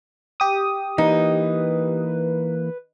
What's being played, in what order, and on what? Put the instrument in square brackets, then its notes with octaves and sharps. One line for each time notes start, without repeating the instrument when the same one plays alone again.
[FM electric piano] G4 D#6
[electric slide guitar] E3 A#3 [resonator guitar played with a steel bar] D#4 [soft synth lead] B4